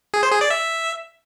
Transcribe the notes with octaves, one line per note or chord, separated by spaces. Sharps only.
G#4
C5
G#4
D5
E5